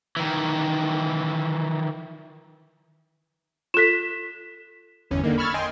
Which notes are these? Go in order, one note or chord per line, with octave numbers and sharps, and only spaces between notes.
D#3 E3
F4 A4 B6 E7
G1 E2 C#4
D3 D#3 A#3
B5 C#6 E6 F6 G#6 A6
D#5 G5 G#5 C6